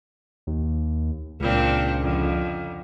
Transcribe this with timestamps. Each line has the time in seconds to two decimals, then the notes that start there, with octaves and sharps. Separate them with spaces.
0.47 D#2
1.40 C#2 A#2 C4 D4
2.01 F2 D3